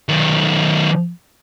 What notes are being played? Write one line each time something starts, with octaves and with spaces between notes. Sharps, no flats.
D#3 F#3